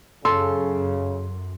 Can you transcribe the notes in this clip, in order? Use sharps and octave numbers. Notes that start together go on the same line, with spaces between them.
F#2 C#3 A4 C6